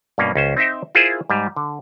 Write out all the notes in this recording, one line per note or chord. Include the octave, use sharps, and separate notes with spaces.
G2 B2 A#3 C#4
C#2 C#4 C5
C4 D#4 C5 E5 G5
E4 F4 G#4 A#4 C5
G#2 G3
D3